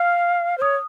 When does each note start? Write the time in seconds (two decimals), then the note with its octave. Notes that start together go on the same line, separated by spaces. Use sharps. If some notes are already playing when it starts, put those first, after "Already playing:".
Already playing: F5 F6
0.58 C5
0.61 C#5 D#6